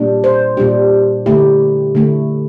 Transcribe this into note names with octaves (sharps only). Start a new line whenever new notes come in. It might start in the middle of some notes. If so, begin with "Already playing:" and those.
Already playing: A#2 G3 D4
C5
A#2 G3 D4 G4
D3 A3 E4 G4
D3 A3 E4